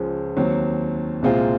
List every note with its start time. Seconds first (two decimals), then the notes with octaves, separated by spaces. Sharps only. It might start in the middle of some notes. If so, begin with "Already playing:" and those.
Already playing: C#2 C#3 F3 G#3
0.37 D#2 D#3 F#3 C4
1.22 C2 A#2 G#3 C4 F4